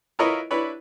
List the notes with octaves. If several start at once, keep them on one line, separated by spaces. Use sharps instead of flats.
E4 F4 A#4 B4 C#5 D#5
D4 E4 B4 C#5